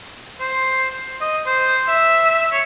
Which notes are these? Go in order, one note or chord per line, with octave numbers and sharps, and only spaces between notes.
C5
D#5
C5
E5
C#5